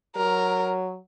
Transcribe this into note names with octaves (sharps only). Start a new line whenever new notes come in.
F#3 A#4